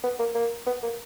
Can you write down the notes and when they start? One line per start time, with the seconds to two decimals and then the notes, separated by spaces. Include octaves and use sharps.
0.04 B3
0.19 A#3
0.35 A#3
0.67 B3
0.83 A#3